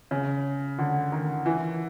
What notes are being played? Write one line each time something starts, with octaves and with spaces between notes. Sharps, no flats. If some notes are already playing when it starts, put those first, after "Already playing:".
C#3
D3
D#3
E3